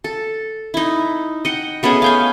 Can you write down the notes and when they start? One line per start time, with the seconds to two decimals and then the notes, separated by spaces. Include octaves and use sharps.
0.04 A4
0.74 D#4 E4
1.45 D#5 F#5 G5
1.83 A3 B3 C#4 G#4
2.02 F5 G5 G#5